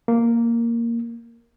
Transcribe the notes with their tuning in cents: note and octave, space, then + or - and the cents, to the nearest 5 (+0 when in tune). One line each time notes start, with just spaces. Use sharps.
A#3 -5